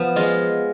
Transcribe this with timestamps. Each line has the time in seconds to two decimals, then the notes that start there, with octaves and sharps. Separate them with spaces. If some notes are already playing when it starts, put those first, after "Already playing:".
Already playing: F3 B3
0.16 G#3 F4